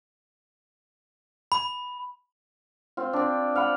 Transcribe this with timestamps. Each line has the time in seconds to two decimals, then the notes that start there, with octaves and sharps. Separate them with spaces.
1.52 B5
2.97 C4 F4
3.13 C4 D4
3.56 F5 F#5 B5